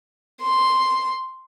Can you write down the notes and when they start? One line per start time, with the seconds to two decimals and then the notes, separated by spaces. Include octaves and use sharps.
0.41 C6